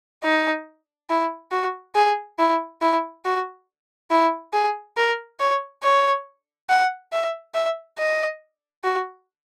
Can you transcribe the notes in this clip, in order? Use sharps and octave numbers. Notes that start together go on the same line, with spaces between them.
D#4
E4
F#4
G#4
E4
E4
F#4
E4
G#4
A#4
C#5
C#5
F#5
E5
E5
D#5
F#4